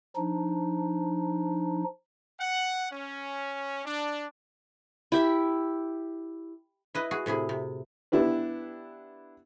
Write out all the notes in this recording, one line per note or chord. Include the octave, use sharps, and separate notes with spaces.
F3 D4 D#4
F#5
C#4
D4
E4 G4 E5
E4 B4 D#5
F#4 G#4
A2 C3 E4 G#4
C3
B3 D4 E4 G4 B4